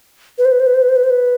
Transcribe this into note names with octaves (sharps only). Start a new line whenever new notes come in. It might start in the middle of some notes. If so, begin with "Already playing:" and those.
B4
C5
B4
C5
B4
C5
B4
C5
B4
C5
B4